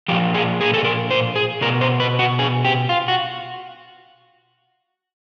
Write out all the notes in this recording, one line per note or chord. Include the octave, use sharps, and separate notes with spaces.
A#2 F3 G4
G#4
G#4
A4
A#4
C5
G#4
B2 A#4
C5
B4
F#4
G#4
G4
F4
F#4